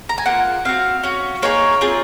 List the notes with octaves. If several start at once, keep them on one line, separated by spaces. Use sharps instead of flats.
A#5
G#5
A#3 F4 G#4 F#5
C4 F#4 F5
C#4 F#4
A#3 D#4 G#4 C#5
C4 F4 G#4